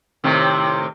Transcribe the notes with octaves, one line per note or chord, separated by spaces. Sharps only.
A2 C3 D#3